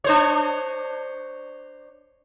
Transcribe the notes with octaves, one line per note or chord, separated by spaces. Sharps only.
D4 C5 C#5